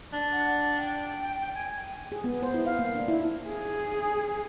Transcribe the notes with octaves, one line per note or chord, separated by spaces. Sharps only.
D4
F#5
G5
G#5
G#4
B3
C5
E4
F5
A#3
D4
E4
G#4